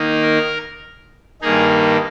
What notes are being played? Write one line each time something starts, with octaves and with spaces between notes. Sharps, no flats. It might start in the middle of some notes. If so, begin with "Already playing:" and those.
Already playing: D#3 A#3 D#4
A#4
G2 D#3 A#3 D#4 G#4